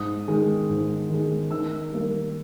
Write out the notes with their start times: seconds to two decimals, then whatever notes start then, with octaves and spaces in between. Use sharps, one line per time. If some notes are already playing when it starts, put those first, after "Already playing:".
Already playing: G#2 D#6
0.28 D#3 G#3
0.70 G#2
1.10 D#3 G#3
1.51 D#3 E6
1.92 G3 A#3